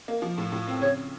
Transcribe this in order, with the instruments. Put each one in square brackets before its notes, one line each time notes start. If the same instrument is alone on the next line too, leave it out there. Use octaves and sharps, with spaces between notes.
[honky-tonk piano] A#3
F3
A2
A2
C4
[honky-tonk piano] C#3 [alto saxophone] C#5